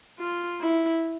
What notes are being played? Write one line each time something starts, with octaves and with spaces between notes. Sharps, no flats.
F4
E4